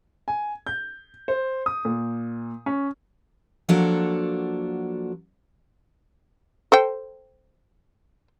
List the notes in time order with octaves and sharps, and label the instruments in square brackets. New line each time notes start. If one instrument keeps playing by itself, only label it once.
[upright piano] G#5
G6
C5
D#6
A#2
C#4
[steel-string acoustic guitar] F3 F#3 A#3 D4 F#4 A4
[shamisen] A4 C5 G5